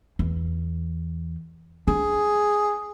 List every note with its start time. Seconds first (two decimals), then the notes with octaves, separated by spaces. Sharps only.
0.19 E2
1.88 D4 G#4